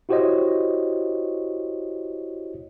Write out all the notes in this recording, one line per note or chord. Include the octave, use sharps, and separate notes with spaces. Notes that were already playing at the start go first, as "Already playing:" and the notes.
E4 F#4 G4 C5 C#5 D#5